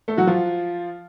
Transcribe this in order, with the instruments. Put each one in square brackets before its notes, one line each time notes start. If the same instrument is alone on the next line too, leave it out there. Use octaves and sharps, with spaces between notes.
[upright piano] A3 A4
F#3 F#4
F3 F4